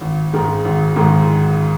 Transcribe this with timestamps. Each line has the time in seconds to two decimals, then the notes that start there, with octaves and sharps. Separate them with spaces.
0.01 G#1
0.33 G#2 D#3 G#3
0.65 G#1
0.96 G#2 D#3 G#3